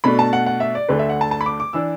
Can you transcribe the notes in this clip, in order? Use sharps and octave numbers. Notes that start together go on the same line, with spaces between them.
B2 A3 D4 B5
A5
F#5
F#5
E5
D5
D2 D3 A3 D4 B4
E5
F#5
A5
A5
B5
D6
D6
E3 D4 E6